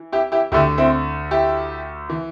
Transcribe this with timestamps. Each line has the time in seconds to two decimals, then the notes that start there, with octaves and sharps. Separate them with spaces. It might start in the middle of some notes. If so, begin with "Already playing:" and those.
Already playing: E3
0.12 E4 G4
0.32 E4 G4
0.52 D2 D3 E4 G4
0.78 C4 E4
1.31 E4 G4
2.10 E3